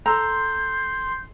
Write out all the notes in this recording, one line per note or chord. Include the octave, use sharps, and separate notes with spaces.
A4 A#5 C6 E6 G6